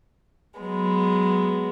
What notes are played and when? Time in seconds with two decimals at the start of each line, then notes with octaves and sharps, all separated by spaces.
0.58 F#3 G#3 B3